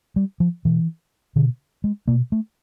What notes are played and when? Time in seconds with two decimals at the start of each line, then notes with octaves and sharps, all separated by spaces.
0.16 G3
0.40 F3
0.65 B2 E3
1.36 B2 D3
1.84 G#3
2.08 B2 A#3
2.32 A3